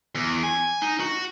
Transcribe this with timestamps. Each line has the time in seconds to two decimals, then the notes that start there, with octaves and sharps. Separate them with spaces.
0.15 E2
0.43 G#5
0.82 D#4
1.00 F#4